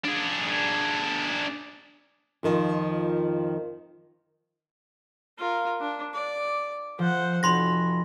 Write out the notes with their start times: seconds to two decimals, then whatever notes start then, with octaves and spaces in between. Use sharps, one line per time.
0.04 D4 G#4
2.43 F2 D#3 F3
5.38 F4 A#4
5.80 D4
6.13 D5
6.99 F3 C5 F#5
7.43 F1 F#4 B5 C6 A#6